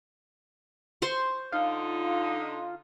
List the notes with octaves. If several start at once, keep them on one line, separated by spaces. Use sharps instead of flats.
C5 C6 C#6
D3 D#4 F4